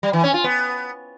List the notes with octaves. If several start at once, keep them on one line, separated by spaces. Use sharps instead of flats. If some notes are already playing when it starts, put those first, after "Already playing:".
G3
E3
C#4
F4
B3